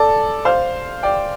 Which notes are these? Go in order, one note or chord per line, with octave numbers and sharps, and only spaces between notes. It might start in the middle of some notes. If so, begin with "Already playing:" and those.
Already playing: A4 D5
C5 F5
D5 G5